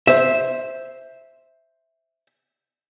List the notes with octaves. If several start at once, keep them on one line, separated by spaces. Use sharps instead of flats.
C5 E5